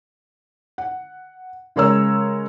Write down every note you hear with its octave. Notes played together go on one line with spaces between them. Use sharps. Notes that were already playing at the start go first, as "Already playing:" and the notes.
F#5
C#3 G#3 A#4 C#5 A#5 E6